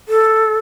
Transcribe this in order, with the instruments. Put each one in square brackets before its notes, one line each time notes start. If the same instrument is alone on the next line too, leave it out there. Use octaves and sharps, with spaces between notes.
[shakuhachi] A4